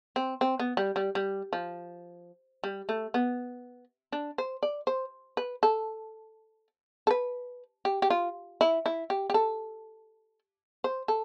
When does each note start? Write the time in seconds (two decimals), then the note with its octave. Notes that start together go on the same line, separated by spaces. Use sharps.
0.16 C4
0.41 C4
0.59 B3
0.77 G3
0.96 G3
1.15 G3
1.53 F3
2.64 G3
2.89 A3
3.14 B3
4.12 D4
4.38 C5
4.63 D5
4.87 C5
5.37 B4
5.63 A4
7.07 A4
7.11 B4
7.85 G4
8.02 G4
8.10 F4
8.61 E4
8.86 E4
9.10 G4
9.30 G4
9.34 A4
10.84 C5
11.08 A4